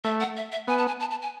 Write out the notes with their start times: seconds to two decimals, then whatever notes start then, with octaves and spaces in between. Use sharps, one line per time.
0.04 A3 E5
0.20 F#5
0.37 E5
0.52 E5
0.67 B3 G#5
0.78 A5
0.87 G#5
1.00 A5
1.11 A5
1.22 G#5